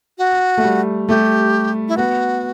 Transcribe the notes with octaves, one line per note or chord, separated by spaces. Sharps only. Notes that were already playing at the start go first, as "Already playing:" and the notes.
F#4
A3
G3
A3 G4
E4
B3 F#4